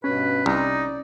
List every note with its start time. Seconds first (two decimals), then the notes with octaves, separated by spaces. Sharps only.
0.04 G2 B2 C#4 B4
0.46 C2 D#4 D5